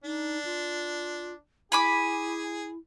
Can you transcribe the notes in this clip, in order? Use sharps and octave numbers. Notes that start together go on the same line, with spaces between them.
D4 D#4
F4
E4 G#4 G#5 B5 D6